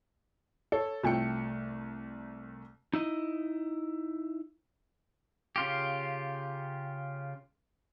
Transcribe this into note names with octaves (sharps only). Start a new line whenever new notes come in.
A4 C#5
C2 A3 F4 G5 C#7
D#4 E4 D#5
C#3 F4 G4